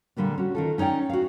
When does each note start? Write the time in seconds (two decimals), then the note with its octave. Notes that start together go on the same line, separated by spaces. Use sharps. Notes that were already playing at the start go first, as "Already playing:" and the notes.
0.17 A#2 D3 G3 A#3 D4
0.38 C#4 F#4
0.55 D#3 F4 A4
0.78 C#4 D#4 C#5 D5 G5
1.09 F#4 F5